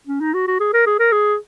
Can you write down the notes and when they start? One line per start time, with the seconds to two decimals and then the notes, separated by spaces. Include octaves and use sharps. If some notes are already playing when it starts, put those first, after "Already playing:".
0.07 C#4
0.20 D#4
0.33 F#4
0.47 F#4
0.60 G#4
0.73 A#4
0.86 G#4
0.99 A#4
1.12 G#4